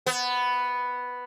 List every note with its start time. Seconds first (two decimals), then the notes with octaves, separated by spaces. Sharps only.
0.06 B3